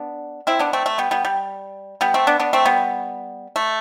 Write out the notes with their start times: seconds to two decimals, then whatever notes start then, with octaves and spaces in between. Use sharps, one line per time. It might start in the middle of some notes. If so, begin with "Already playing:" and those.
Already playing: B3 D4
0.47 C4 E4
0.59 B3 D4
0.73 A3 C4
0.86 A3
0.98 G3 B3
1.11 G3 B3
1.25 G3
2.01 G3 B3
2.14 A3 C4
2.27 B3 D4
2.40 B3 D4
2.53 A3 C4
2.66 G3 B3
3.56 A3